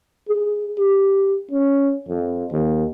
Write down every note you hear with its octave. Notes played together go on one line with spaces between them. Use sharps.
G#4
G4
C#4
F2
D#2